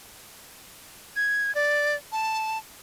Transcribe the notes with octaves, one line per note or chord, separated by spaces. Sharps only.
G#6
D5
A5